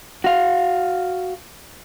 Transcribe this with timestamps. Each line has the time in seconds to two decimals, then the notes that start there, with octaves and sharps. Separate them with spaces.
0.24 F#4 F5